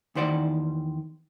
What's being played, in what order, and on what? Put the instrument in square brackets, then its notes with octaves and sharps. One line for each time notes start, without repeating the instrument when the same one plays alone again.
[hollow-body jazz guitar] E2 D#3 C5 D5 F#5